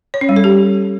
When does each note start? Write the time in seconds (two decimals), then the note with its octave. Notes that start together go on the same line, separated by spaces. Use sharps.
0.14 C#5
0.21 C#4
0.29 G3
0.36 A4
0.44 G4